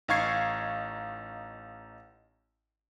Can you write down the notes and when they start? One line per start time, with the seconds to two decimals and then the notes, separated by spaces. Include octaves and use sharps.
0.08 A1 D#4 F5 C#6 G#6 C7